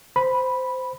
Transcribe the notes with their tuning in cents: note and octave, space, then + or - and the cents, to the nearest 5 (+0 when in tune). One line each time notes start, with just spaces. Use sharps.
C5 -15 B5 -5